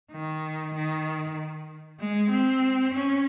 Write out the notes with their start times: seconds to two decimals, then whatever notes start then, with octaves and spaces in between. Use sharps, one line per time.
0.12 D#3
0.74 D#3
2.00 G#3
2.31 C4
2.94 C#4